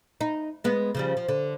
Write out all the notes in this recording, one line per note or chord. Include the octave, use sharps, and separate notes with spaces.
D#4
G#3 B3
C#3 F3 G3
F3
D3